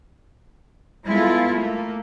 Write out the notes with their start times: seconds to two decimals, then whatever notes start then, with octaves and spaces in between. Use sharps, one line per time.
1.06 G#3 B3 E4 F4 A4
1.52 A3 A#3